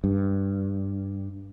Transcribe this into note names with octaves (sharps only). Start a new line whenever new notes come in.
G2